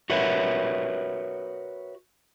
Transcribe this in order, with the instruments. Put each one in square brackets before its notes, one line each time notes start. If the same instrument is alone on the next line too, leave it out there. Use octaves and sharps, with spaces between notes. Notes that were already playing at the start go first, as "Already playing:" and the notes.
[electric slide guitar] F#4 A#4 B4 C#5 E5